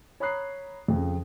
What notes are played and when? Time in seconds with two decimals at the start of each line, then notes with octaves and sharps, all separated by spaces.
0.20 C#5 A#5 B5 D#6 F#6 C7
0.88 F2 C#3